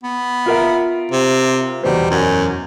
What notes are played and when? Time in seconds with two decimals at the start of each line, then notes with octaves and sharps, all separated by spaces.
0.03 B3
0.46 F4 A#4 E5
1.12 C3
1.83 E2 B2 G3 C5
2.10 F#2